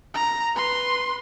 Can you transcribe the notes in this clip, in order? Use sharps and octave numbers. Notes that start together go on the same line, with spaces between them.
A#5
B4 C6